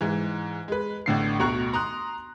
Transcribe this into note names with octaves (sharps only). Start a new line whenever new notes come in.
G#2 E3
G#3 B4
A1 A2 D3 C7
D2 B2 F#4 A#5 C#6 F#6
A#5 C6 D#6 F#6